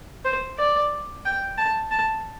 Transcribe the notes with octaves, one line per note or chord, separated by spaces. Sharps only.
C5
D5
G5
A5
A5